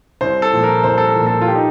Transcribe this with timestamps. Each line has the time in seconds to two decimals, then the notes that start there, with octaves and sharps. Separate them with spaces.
0.21 C2 C5
0.42 A4
0.53 A#2 F3
0.63 A#4
0.84 C2 C5
0.98 A4
1.05 A#4
1.16 A#2 F3
1.26 A4
1.41 F4
1.48 G4
1.56 D#4